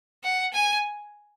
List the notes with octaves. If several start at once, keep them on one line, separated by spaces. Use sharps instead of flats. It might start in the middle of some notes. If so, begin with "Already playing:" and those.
F#5
G#5